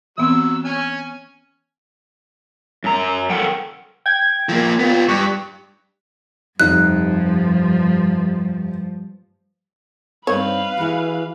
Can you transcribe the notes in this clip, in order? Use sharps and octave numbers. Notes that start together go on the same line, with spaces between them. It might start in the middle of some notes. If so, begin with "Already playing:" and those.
E3 F#3 B3 C4 E6
C#4 G#5
F#2 A#5
A4 A#4 F#5 G5
G5 G#6
F3 A#3
B3 F4
G2 C#6 F#6 B6
F1 G2 F3 D#4 F#6
G2 C4 D#4 B4 C#5 F5
E3 F#4 G#4